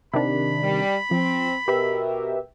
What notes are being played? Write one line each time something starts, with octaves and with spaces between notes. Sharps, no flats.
C3 D#3 D4 B5
G3
F3 C4
B2 G4 A#4 B4 E5